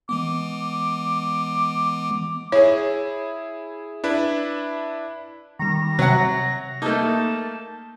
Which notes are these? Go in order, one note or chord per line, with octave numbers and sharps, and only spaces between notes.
E3 G#3 B3 D6
E4 G#4 C#5
D4 E4 B4
D#3 G3 A#6
C3 F#3 F#5
A3 A#3 D#4 A5 G6